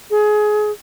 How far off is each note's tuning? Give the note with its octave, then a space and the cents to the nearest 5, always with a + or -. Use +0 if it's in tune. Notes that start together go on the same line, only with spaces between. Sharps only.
G#4 +25